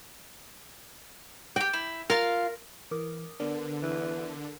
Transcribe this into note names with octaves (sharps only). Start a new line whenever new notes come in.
F#4 G4 G5
E4
F4 A#4 F5
E3 A#4 D6 D#6
D3 B3 D4 A#4
E3